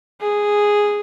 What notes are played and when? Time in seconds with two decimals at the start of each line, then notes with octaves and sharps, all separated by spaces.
0.21 G#4